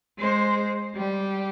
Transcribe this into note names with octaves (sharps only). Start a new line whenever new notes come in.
G#3 C5
G3 G4